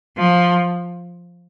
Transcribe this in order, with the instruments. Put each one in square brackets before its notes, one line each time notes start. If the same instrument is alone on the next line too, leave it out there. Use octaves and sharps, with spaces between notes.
[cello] F3